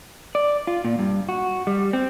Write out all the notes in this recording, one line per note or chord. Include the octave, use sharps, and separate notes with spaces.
D5
F4
A#2
G2
F#4
G3
C4